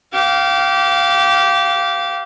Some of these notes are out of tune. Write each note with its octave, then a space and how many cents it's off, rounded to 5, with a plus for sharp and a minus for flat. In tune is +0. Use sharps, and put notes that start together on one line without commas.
G4 -25 F5 +0